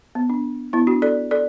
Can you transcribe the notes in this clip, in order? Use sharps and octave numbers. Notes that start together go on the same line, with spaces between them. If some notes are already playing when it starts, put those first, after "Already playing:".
B3
D4
B3 E4
D4 F#4
A4 D5
A4 D5